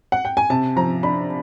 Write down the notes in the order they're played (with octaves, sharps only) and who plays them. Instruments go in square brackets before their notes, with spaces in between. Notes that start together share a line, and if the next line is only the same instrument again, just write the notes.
[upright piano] F#5
G5
G#5
C3 A5
F3 A#5
D4 B5